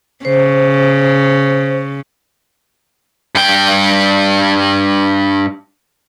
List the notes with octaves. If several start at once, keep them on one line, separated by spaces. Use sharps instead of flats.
C#3 C5
G2 G5